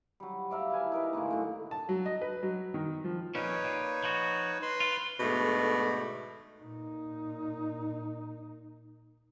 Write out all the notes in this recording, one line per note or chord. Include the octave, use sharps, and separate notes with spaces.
F#3 G3
D5 E5 F5 A#5
E4 B4 G#5 A5
D#4 A#4 B4
A2 D3 G#3 A#3
D3 F#3
A5
F#3
D#5
B4
F#3
D#3
F3
F2 A#2 C#4 D#4 B4 C#5
A#2
F3 F#4
B4 B5 C6
F4
G#2 B2 D3 A3
A#2 D#4